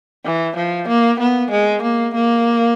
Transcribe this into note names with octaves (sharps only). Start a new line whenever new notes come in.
E3
F3
A#3
B3
G#3
A#3
A#3